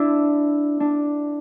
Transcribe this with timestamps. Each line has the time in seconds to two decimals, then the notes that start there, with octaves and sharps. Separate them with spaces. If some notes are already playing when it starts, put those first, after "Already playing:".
Already playing: D4 E4
0.80 D4